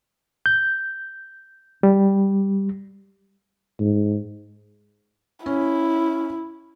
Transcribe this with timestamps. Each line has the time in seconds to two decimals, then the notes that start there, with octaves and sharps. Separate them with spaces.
0.46 G6
1.83 G3
3.80 G#2
5.46 C#4 E4